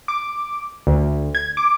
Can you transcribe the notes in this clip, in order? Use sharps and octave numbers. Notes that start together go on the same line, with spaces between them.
D6
D2
G#6
D6